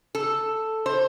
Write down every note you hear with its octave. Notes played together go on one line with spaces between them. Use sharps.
A4
C5